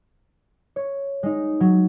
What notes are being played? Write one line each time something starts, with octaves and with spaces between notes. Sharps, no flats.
C#5
G#3 D#4
F#3